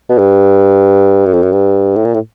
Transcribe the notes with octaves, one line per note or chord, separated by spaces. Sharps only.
B2
G2
F#2
F2
F#2
G2
A2
A#2
A2